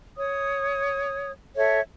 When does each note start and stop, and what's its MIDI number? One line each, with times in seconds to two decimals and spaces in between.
0.17 1.31 73
0.17 1.31 87
1.56 1.79 69
1.56 1.79 73
1.56 1.79 76